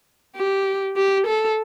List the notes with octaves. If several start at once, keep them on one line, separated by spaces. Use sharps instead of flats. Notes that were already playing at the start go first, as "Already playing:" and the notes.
G4
G4
A4